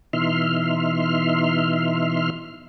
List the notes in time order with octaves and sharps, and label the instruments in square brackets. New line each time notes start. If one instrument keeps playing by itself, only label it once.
[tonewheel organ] B2 E3 D#4 E5 C6 F6